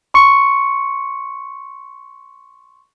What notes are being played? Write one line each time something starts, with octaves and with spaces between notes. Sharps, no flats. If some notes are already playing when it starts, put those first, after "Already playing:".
C6 C#6 C#7